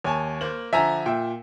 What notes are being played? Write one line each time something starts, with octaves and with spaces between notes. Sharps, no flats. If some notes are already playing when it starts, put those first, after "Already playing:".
D#2 C#5 G#5 A5
A#3 C5 F#7
D3 F3 E5 G#5 A#5
A#2 E5 G5